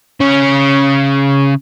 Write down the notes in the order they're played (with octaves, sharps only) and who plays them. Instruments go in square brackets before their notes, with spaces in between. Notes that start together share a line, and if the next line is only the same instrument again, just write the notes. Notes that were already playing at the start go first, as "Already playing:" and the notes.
[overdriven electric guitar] C#3 C#4